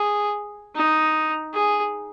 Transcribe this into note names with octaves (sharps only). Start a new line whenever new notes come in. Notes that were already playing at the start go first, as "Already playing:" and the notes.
Already playing: G#4
D#4
G#4